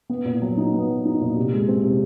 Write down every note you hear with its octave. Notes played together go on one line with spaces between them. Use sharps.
B3
A#2
F#3
D#4
B3
F#3
D#4
A#2
C3
G#3
C4
C3